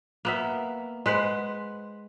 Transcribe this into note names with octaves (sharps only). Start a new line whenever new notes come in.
A#3 B3 E5
G#3 B4 C5 F#5